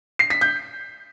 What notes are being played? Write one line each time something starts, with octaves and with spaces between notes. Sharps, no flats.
C7
B6
G6